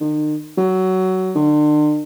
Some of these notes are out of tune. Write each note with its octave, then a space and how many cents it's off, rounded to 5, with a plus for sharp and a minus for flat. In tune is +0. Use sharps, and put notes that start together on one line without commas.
D#3 -40
F#3 +15
D3 +40